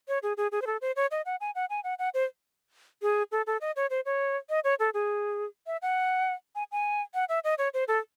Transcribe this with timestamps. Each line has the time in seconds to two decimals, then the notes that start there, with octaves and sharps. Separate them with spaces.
0.08 C#5
0.23 G#4
0.37 G#4
0.52 G#4
0.62 C5
0.67 A4
0.81 C5
0.96 C#5
1.11 D#5
1.26 F#5
1.41 G#5
1.55 F#5
1.70 G#5
1.84 F#5
1.99 F#5
2.14 C5
3.02 G#4
3.32 A4
3.47 A4
3.61 D#5
3.76 C#5
3.90 C5
4.06 C#5
4.50 D#5
4.64 C#5
4.79 A4
4.94 G#4
5.67 E5
5.82 F#5
6.55 G#5
6.72 G#5
7.14 F#5
7.29 E5
7.44 D#5
7.58 C#5
7.74 C5
7.88 A4